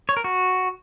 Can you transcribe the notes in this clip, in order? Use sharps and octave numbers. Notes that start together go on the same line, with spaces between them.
C#5
A#4
F#4